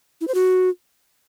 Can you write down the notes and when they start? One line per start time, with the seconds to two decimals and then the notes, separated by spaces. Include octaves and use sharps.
0.21 E4
0.28 C5
0.35 F#4